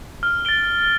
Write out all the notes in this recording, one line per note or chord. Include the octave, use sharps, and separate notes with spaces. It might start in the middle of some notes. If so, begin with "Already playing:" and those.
F6
A6 D7 G7